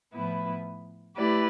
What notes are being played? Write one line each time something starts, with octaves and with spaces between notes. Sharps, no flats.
A2 F3 B3 E4 B4
A3 E4 G4 B4 D5